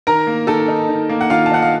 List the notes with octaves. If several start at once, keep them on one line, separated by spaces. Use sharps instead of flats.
D#3 A#4 A#5
A#3
D#3 A4 A5
D#4
D#3
A#3
F#5
D#3 F4 F5
A5
D#4 F#5
F5